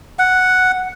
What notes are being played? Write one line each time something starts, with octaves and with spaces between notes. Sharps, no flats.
F#5